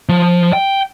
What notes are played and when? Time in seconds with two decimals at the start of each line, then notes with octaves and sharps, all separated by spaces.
0.09 F3
0.53 G5